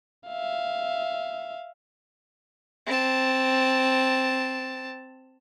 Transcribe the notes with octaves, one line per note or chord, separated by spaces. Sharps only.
E5 F5
C4 A5